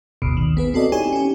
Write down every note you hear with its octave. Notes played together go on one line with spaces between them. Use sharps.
G#1 D2 B2
D#3
B3 G#4 B4
C4 F#4 A4 D5 D#5
D#4 E4 G4 C#5 G#5
C#4 G4